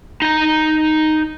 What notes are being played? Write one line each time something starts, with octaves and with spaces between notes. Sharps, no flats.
D#4 A#5